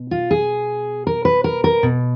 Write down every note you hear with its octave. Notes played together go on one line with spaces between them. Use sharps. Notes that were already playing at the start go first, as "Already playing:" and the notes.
Already playing: B2
F4
G#4
A#4
B4
A#4
A#4
B2